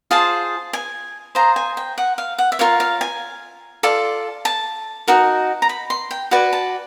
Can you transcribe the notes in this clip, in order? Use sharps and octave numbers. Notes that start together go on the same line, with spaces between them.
F4 G#4 C5 A5
G#5
F4 G#4 C5 A#5
G#5
G5
F#5
F5
F#5
E5
F4 A#4 C#5 F5
F5
G#5
F4 A4 D5
A5
D#4 F#4 A#4
A#5
B5
C6
G5
F#4 B4 D5 G#5
A5